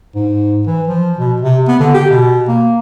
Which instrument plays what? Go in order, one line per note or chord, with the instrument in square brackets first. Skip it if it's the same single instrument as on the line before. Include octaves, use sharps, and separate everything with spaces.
[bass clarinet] G#2
E3
F3
B2
C3
B3
D3
G4
B2
A#3